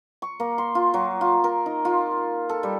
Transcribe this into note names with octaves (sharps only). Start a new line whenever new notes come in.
C#6
A#3
C6
F4
F#3
F4
A#4
D#4
F4
A4
G3